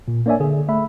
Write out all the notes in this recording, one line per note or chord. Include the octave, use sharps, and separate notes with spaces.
A#2
A#3 D4 C#5 D5 E5 G#5
D3 G#4
A3 E5 B5